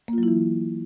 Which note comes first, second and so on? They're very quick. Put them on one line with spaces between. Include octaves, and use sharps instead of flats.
A#3 F4 F#3 E4 E3